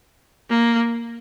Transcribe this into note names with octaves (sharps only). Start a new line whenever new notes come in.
A#3